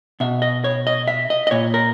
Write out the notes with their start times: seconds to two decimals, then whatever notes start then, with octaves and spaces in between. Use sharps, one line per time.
0.20 B2 E5
0.42 D#5
0.64 C#5
0.87 D#5
1.08 E5
1.30 D#5
1.47 D#5
1.51 A#2 C#5
1.74 A#4